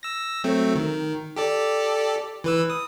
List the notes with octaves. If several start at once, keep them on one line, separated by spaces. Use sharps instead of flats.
E6 A#6
F#3 A3 C4
D#3
G4 A4 D5
E3 B4 E6
D#6